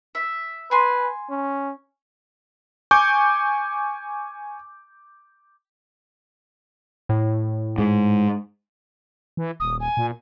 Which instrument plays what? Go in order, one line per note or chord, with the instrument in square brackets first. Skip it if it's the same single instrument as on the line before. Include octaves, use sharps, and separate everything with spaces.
[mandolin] E5
[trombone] B4 [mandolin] G#5 C6
[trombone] C#4
[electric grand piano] G#5 C#6 D6 G6
[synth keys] A2
[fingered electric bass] G#2
[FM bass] E3
[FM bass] D#1 [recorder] D#6
[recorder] G#5
[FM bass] A#2